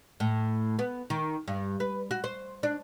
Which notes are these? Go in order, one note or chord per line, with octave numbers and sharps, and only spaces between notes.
A2
B3
D#3
G2
B4
F#4
C5
D4